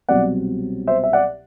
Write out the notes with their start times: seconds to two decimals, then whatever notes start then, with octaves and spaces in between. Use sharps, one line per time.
0.08 C2 B2 F#3 C4 D5 F#5
0.87 C5 E5
1.04 E5
1.13 D5 F#5